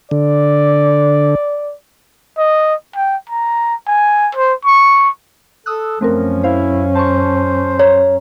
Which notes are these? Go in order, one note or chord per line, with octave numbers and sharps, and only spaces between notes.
D3 D5
D#5
G5
A#5
G#5
C5
C#6
A4 D#6 E6 F#6
F#2 F3 A3 C4 C#4 A#4
E4 C5 F5
C5 A5 C#6
C#5 A#5